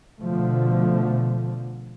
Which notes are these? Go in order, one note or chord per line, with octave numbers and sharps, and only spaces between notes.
B2 D3 F3 A3